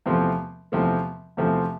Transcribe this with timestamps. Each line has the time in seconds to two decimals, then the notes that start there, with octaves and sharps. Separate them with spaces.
0.06 E2 C3 F3 A3
0.72 E2 C3 F3 A3
1.37 E2 C3 F3 A3